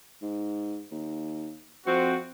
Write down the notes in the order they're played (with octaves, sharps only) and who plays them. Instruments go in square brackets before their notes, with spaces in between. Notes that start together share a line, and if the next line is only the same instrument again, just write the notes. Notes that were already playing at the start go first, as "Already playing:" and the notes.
[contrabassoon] G#2
D#2
[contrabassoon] F2 [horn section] C4 F#4